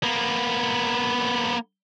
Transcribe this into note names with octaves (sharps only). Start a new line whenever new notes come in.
A#3 B3